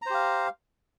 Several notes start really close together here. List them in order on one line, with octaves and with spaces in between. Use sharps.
A#5 C5 G4 F5